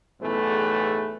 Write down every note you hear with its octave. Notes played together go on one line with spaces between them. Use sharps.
B1 E2 A2 A3 G#4 B4